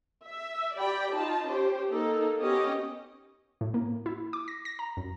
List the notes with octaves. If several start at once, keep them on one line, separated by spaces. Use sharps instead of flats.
E5
G4 D5 G5 B5
D#4 F4 A5
C#4 G4 C5
A#3 D#4 A4
B3 C#4 G4 D#5
A2
A#3
E4
D6
A#6
A#6
A#5
F#2